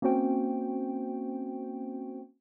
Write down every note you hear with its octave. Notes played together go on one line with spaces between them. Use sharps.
A#3 C4 C#4 F#4 C5 G5